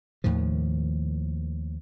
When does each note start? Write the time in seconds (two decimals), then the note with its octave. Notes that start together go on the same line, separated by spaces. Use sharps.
0.24 D#2 A2 D#3 F3